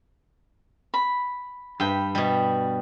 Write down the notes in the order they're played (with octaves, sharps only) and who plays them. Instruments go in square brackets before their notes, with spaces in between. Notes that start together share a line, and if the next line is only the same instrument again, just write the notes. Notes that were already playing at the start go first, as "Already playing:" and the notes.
[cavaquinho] B5
[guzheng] G2 [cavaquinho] G5 B5
[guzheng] B2 G3